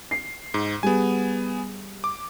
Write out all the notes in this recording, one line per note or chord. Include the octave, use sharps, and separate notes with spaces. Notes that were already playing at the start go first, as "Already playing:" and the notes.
C7
G#2
G3 B3 G#4 G#5
D6